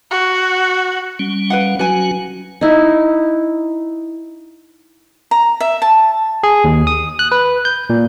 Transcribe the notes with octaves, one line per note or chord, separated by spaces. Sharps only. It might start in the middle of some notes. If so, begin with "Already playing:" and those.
F#4
G3 C#4
B4 F5 F#5
F#3 C#4 F#4 B4 G#5
D#4 E4
A#5
E5
A5
G#4
D#2
D#6
F#6
B4
G6
A#2